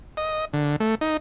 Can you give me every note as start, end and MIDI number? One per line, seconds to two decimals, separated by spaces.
0.17 0.45 75
0.53 0.76 50
0.80 0.95 57
1.01 1.17 63